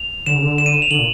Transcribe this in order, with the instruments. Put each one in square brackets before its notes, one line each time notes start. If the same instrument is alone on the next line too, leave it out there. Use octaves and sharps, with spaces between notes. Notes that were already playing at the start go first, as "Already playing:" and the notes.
Already playing: [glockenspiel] F7
[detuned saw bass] D3 [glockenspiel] E7
[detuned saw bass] C#3
D3
[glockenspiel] E7
D#7
E7
F7
[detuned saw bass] D3 [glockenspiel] F#7
[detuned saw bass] A#2